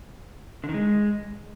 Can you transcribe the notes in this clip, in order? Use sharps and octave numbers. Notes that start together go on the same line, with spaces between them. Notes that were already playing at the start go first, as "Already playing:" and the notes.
D3
D#3
G#3